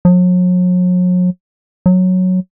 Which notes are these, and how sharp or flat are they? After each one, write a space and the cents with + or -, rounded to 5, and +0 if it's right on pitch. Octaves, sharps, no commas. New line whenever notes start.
F#3 -40
F#3 -5